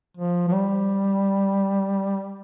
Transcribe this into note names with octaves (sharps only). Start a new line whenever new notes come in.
F3
F3
G3